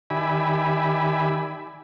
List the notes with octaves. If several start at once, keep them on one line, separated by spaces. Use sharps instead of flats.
D#3 G4 D5 E5 G#5 B5